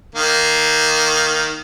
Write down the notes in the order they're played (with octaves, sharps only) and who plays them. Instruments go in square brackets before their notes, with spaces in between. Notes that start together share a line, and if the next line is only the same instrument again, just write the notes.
[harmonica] D#3 A#3